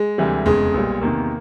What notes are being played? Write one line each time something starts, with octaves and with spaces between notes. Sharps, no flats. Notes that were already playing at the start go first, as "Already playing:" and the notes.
Already playing: G#3
D2 C3 E3 G3
F1 E2 C#3 G#3
B1 A#2 G3
E2 C3 D#3 A#3